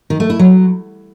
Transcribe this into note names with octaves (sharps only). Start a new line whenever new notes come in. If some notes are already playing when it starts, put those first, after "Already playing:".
D#3
A3
E4
F#3